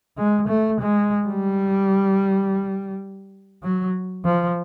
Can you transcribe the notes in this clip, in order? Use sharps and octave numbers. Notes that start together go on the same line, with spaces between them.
G#3
A3
G#3
G3
F#3
F3